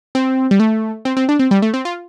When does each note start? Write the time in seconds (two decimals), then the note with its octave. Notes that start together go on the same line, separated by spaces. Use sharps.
0.15 C4
0.51 G3
0.60 A3
1.05 C4
1.17 C4
1.29 D4
1.39 C4
1.51 G3
1.62 A3
1.74 C4
1.85 F4